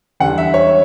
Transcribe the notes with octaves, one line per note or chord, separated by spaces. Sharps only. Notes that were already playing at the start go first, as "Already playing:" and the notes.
E2 D3 G3 F#5
E5
C#5